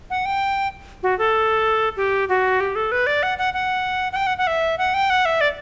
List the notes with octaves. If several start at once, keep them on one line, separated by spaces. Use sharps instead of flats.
F#5
G5
F#4
A4
G4
F#4
G4
A4
B4
D5
F#5
F#5
F#5
F#5
G5
F#5
F#5
E5
F#5
G5
F#5
E5
D5